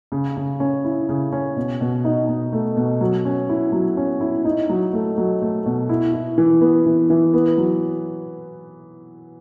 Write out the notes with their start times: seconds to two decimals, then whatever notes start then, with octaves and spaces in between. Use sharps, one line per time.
0.12 C#3
0.37 C#3
0.60 C#4
0.85 E4
1.09 C#3
1.32 C#4
1.56 B2
1.81 B2
2.05 D#4
2.29 B2
2.53 A3
2.77 B2
3.01 F#3
3.25 C#4
3.49 E4
3.72 F#3
3.97 C#4
4.21 E4
4.45 D#4
4.69 F#3
4.93 A3
5.18 F#3
5.42 A3
5.66 B2
5.89 E4
6.14 E4
6.38 E3
6.61 B3
6.86 E3
7.10 E3
7.34 B3
7.58 F#3